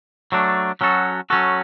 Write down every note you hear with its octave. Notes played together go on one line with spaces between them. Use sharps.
F#3 A3 D4
F#3 C#4 F#4 A4
F#3 C#4 F#4 A4